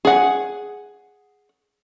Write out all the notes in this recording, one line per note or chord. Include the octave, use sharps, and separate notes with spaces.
G#4 F#5